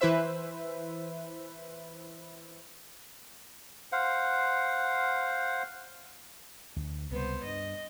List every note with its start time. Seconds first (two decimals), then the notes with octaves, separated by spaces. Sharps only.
0.01 E3 E4 B4 C5 E5
3.92 C5 F5 F#5
6.76 D2
7.10 C#2 C3 G3 B3 C5
7.44 G2 D#5